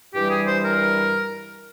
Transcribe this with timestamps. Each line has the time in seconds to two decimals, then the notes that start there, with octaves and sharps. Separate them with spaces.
0.14 G2 E3 G3 G4
0.30 G#4
0.48 C5
0.64 A#4